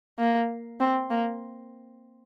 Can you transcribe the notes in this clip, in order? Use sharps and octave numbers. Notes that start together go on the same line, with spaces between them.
A#3
C4
A#3